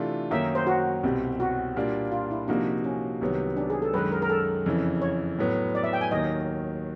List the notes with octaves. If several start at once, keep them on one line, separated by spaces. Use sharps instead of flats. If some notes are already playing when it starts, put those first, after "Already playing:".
Already playing: C3 E3 A3 D4 F4
F#2 D#3 F#3 A#3 D#4 E5
C5
F#4
C2 B2 G3 C4
F#4
A#2 G3 A#3 D4 F4
F4
E4
C3 F3 A#3 D4 D#4 F#4
C#4
C2 C3 D#3 F#3 B3
D4
G#4
A4
F#2 D#3 G#3 B4
A#4
A#4
A4
F2 C#3 E3
C#5
A2 F#3 B3
D5
E5
G5
G#5
D#2 D#3 F#3 D#5